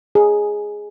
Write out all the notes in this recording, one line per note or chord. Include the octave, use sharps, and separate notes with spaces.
G#4